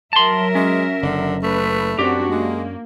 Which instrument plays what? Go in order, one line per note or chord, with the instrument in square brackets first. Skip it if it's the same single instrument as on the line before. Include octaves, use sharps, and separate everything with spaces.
[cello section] F#3 A#4 E5 [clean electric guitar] A5 C6
[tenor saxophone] G#3 [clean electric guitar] C#4
[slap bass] F#1 [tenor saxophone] D3
[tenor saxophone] A3 [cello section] B4
[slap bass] F#2 [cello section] C4 D4 F#4 [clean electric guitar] G4
[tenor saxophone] G#3 [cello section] A#3